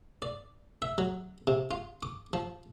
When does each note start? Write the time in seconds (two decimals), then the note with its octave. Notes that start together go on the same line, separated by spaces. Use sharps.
0.22 D5
0.82 E5
0.98 F#3
1.47 C3
1.71 F4
2.03 D6
2.33 F3